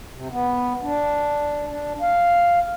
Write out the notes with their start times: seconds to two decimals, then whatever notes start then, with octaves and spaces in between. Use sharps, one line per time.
0.14 C3
0.31 B3
0.83 D4
1.68 D4
2.01 F5